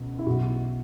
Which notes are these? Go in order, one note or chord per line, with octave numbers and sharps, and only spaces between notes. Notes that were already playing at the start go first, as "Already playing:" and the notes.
Already playing: C#2 B2
E4
B1 B2 F#4